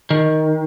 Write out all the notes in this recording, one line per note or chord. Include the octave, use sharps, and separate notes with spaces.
D#3